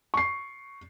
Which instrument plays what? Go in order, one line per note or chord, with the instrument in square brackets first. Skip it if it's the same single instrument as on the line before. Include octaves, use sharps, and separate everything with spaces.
[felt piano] C#6 C7